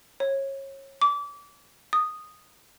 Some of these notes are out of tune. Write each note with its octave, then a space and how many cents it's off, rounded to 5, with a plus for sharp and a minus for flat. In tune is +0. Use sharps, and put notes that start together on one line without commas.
C#5 -25
D6 -30
D#6 -10